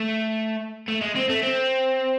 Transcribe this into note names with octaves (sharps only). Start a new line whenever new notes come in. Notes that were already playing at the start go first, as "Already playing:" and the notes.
Already playing: A3
A3
G#3
C4
A3
C4